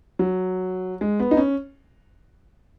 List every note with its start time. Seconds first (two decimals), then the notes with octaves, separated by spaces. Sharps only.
0.19 F#3
1.01 G#3
1.20 B3
1.31 D#4
1.37 C#4